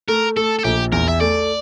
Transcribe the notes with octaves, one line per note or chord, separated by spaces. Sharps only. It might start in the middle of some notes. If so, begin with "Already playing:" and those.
A3 A#4
A3 A4
A4
A#1 G4
E2 A#4
E5
A3 D5